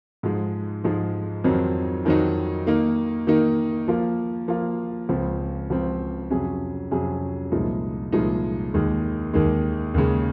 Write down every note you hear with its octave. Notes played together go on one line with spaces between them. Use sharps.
G#2 F3 G#3 D#4
G#2 F3 G#3 D#4
F2 D#3 F#3 C4 D#4
F2 D#3 F#3 C4 D#4
D#3 A#3 D#4
D#3 A#3 D#4
F3 A#3 F4
F3 A#3 F4
C#2 C#3 F3 C4
C#2 C#3 F3 C4
F2 C3 F#3 C#4 G#4
F2 C3 F#3 C#4 G#4
C2 A#2 F3 G#3 D#4
C2 A#2 F3 G#3 D#4
D#2 D#3 G#3
D#2 D#3 G#3
D#2 C#3 G#3